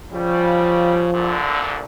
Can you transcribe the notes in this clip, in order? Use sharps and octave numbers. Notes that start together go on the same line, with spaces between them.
C#3 F3 G3
C2 A#2 D3